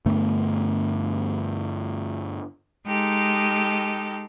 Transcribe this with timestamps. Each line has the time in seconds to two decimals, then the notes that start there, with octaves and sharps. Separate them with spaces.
0.06 G2 D3 A3 B3
2.87 G#3 D#4 G4 A4